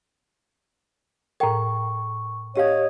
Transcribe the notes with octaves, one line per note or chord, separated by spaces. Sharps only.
A2 A4 A#4 G5 C#6
C#4 G4 C#5 D#5 F5 D#6